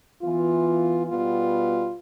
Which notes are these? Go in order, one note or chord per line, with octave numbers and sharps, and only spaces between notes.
E3 B3 F4
B2 G3 B3 F4